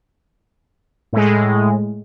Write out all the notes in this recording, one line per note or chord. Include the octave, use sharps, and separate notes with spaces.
A2 G#3